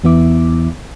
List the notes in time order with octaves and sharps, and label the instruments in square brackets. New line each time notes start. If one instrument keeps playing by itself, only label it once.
[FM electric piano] E2 E3 B3 E4 E5 D6